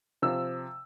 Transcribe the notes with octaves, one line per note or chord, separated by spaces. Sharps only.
C3 F3 E6